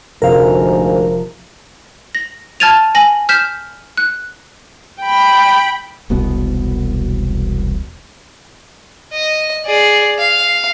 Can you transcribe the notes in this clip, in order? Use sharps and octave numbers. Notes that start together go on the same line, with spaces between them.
F1 D2 G#2 A#4 C5 F5 A#5
A#6
A5 F6 G#6 A6 D#7 F7
G#5 A#6 F#7
F6 G6 B6 E7
F#6
G5 B5
E1 C2 B2 B3
D#5
G#4 D5
F5